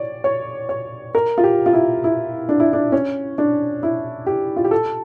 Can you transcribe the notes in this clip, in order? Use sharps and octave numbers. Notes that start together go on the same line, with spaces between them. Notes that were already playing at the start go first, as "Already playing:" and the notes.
Already playing: C#5 D5
C#5
C#5
A#4
F4
G4
F4
E4
E4
D4
E4
D4
C#4
D4
E4
G4
F4
G4
A4